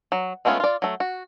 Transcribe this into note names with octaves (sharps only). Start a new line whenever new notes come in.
F#3
G#3 A3 B3 C#4 F4
F4 D5
F#3 A3
F#4